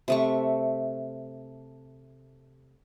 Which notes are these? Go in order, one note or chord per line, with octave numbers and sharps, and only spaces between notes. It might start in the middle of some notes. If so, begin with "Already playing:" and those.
C3 A3 C#6